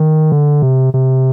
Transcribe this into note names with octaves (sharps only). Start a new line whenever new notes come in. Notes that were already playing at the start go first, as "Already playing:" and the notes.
Already playing: D#3
D3
C3
C3